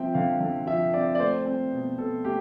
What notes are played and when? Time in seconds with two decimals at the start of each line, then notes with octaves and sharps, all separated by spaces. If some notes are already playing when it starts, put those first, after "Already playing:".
Already playing: F3 C4 E5 G5
0.14 D3 F5
0.40 D3
0.66 F3 E5
0.93 C4 D5
1.15 D5
1.19 A3 C5
1.46 C4
1.72 B2
1.98 B2 A4
2.25 A3 G4